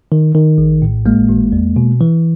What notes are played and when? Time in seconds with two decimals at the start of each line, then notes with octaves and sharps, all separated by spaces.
0.12 D#3
0.35 D#3
0.58 A#1
0.82 A2
1.06 G#1 G#3 A#3
1.29 G#1
1.52 E2
1.76 B2
2.01 E3